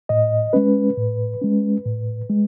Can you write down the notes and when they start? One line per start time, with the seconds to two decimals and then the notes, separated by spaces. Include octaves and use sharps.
0.09 A2 D#5
0.53 G#3 C#4 B4
0.97 A2
1.41 G#3 C#4
1.85 A2
2.30 G#3